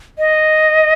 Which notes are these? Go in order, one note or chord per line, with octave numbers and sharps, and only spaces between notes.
D#5